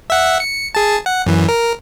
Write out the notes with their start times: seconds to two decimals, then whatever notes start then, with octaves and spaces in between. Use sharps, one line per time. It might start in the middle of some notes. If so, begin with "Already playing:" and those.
0.10 E5 F#5
0.40 C#7
0.75 G#4 A5
1.06 F#5
1.26 F#2 E3
1.49 A#4